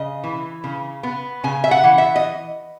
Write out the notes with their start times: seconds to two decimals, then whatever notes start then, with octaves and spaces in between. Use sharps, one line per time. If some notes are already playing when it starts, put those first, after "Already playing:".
Already playing: C#3 D#5
0.24 E3
0.64 C#3
1.03 B3
1.44 C#3 G#5
1.64 E5
1.71 F#5
1.84 E3
1.98 E5
2.16 D#5